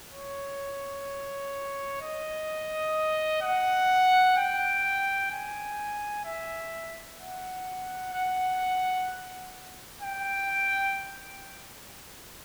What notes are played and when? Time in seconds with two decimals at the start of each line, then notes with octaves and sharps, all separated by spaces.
0.12 C#5
2.01 D#5
3.42 F#5
4.37 G5
5.31 G#5
6.25 E5
7.19 F#5
8.13 F#5
10.02 G5